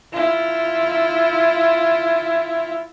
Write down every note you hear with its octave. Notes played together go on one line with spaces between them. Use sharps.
E4 F4